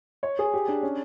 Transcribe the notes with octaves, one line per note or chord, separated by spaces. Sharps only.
C#5
G#4
G4
D4
C#4